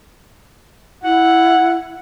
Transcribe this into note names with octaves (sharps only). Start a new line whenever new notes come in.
E4 F#5